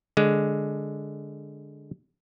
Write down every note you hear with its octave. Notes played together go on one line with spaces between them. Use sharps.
D3 G#3